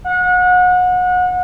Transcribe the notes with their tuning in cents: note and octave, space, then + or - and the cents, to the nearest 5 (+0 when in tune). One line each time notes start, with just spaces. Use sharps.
F#5 -30